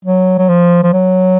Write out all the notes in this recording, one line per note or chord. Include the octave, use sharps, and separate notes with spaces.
F#3
F#3
F3
F3
F#3